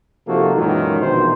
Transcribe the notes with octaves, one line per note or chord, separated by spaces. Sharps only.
C3 F3 A#3 D#4 F#4 A4
F#2 A#2 D#3 E3 G#3
A#1 B2 D#3 E3 C5